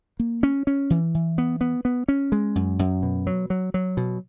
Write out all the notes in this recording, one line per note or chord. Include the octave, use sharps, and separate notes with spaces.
A#3
C#4
C#4
E3
E3
B3
B3
B3
C#4
G#3
F#2
F#2
B2
F#3
F#3
F#3
B2